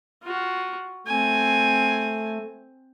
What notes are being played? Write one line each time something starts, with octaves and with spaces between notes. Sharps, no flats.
F4 F#4
A3 C4 G#5